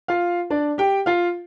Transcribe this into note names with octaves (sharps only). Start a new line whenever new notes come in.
F4 F5
D4 D5
G4 G5
F4 F5